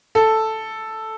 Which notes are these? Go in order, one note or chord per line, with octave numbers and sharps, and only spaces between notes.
A4